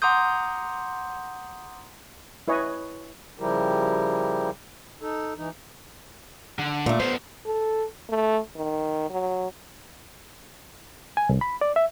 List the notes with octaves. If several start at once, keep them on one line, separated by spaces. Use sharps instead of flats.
F#5 A#5 C6 D6 D#6 G6
E4 B4 C#5 D#5 G#5
C#3 F3 G3 E4 G4 A#4
D#4 A4
E3 D#4
D3
A#2 A3
B3 F4 C5
A4
A3
D#3
F#3
G#5
C2
B5
D5
E5